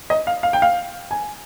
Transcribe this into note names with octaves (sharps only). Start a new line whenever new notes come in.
D#5
F5
F5
G5
F5
G#5